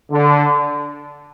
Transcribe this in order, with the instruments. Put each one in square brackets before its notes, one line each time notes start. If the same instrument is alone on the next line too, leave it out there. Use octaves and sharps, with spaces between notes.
[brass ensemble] D3